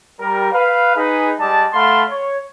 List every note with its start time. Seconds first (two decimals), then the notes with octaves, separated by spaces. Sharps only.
0.20 G3 A#4
0.52 B4 F5
0.95 D#4 G#4 B4
1.39 G3 G#3 D5 D#5 A5
1.73 A3 F5 F#5 A5 B5 C6
2.10 C#5